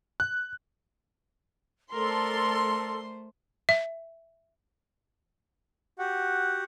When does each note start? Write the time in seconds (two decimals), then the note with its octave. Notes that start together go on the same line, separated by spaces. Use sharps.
0.20 F#6
1.93 A3 A4 A#4 C5 D5 C6
3.69 E5
5.99 F#4 G4 F#5